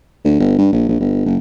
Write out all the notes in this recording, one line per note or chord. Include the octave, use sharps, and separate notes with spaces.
D2
G1
G2
A#1
A#1
G1
F#1